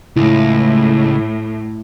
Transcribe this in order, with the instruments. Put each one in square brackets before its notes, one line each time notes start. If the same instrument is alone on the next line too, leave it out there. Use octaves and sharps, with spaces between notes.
[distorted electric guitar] C#2 [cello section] A2 [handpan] E4